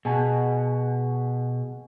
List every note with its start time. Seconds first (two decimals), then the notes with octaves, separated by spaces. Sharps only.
0.05 B2 G#4 G#5 A5